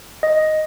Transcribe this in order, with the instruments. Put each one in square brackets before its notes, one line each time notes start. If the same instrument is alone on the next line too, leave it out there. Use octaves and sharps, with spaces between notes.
[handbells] D#5